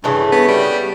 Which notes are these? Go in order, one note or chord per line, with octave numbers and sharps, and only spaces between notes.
G2 C#3 E3 A3
B3
G3
B3